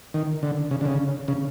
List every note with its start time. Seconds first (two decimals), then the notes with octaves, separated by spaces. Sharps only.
0.14 D#3
0.43 D3
0.71 C#3
0.81 D3
0.85 C#3
1.28 C#3